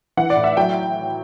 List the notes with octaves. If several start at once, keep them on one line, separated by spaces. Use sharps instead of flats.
E3 F#5
D5
A2
E5
F#3 G5